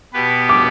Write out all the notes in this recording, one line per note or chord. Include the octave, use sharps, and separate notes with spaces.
B2 B3 G4 B4
D6